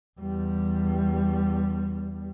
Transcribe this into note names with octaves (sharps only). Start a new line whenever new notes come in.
E2 G3